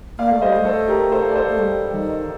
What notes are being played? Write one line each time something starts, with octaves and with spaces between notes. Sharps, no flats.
A#3 D5 F5
A3 F5
G3 C5 D#5
A3
A4 C5
G4 A#4
A4 C5
D5
A4 C5
A3
G3
D#3